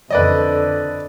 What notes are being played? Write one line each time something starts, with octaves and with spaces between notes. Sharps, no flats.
F2 D3 B4 D5 D#5